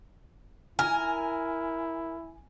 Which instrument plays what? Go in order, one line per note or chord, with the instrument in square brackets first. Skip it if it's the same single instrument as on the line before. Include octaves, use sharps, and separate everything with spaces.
[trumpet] E4 [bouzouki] A#4 [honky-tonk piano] G#5